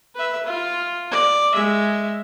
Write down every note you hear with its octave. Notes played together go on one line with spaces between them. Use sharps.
B4 E5
F4
D5
G#3 E5